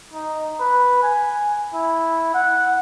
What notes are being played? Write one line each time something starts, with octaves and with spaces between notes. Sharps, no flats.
D#4
B4
G#5
E4
F#5